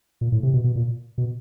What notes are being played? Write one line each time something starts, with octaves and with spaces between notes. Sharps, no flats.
A#2
A2
C3
B2
B2
A#2
B2